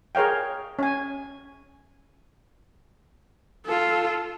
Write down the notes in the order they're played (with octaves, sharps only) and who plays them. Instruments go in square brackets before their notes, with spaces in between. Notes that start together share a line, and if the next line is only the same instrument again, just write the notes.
[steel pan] G#4 A#4 C#5 F5 G5
C#4 G#5
[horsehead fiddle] F4 A4